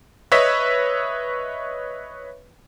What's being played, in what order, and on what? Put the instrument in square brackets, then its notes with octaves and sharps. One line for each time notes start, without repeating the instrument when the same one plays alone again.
[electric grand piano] B4 C#5 D#5 E5 E6 B6